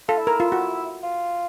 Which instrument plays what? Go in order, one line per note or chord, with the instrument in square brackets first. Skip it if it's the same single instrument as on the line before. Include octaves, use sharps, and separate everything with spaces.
[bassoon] F4 [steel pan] A4
[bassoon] E4
[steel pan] A#4
F4
F#4
[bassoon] F4